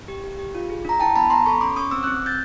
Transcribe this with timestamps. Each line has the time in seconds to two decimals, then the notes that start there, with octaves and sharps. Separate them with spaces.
0.08 G4
0.24 G4
0.39 G4
0.55 F4
0.70 G#4
0.85 D4 A#5
1.00 E4 G5 A5
1.16 B3 A5 B5
1.30 B3 A#5 C6
1.46 A4 B5 C#6
1.61 C#4 C6 D6
1.76 C#4 C#6 D#6
1.91 C4 D6 E6
2.03 E6 F#6
2.07 C4
2.23 C4 G6 A6